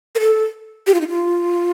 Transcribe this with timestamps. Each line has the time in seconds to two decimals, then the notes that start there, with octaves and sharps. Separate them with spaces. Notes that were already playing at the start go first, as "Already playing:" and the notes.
0.15 A#4
0.20 A4
0.87 G4
0.94 F4
1.01 D#4
1.08 F4